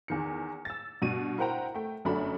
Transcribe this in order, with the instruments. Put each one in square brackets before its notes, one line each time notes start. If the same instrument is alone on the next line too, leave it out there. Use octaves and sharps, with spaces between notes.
[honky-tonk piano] E2 D#3 C#7
E6 A6
G2 B2 D#7
E4 A#4 C5 F#5 G5 A#5
A3 G5
G1 F#2 A3 D4 F#4 B5